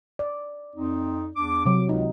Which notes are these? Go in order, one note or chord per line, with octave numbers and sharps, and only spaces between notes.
D5
F2 C4 D#4
E2 D4 D6
C3 F#3 D6
C#2 D#4